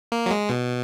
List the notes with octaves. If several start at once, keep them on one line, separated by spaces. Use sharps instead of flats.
A#3
F#3
G#3
B2